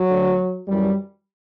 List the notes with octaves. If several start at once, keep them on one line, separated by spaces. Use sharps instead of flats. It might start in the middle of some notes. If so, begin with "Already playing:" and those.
Already playing: F#3
D2 D3
F#2 E3 G3